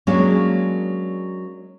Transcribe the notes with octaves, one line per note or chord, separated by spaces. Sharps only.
F#3 G#3 A#3 C#4 D4